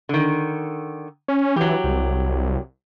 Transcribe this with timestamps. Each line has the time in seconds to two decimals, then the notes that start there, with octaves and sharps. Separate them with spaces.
0.09 D3 D#3
1.28 C#4
1.56 E3 F#3 G4
1.84 C2